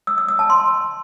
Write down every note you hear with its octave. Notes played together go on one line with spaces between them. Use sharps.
E6
E6
E6
A5
C6